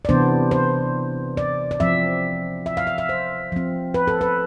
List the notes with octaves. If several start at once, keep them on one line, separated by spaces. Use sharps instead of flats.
D5
C3 E3 B3 D4 C5
C5
D5
D5
F3 C4 E5
E5
F5
E5
E5
C5
F3 C4
B4
A4
B4